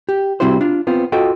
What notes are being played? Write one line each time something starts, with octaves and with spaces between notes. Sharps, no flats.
G4
C3 G3 C4 E4 F#4 C5
D4 F4
B3 C4 F4
F4 F#4 A4 D#5 G5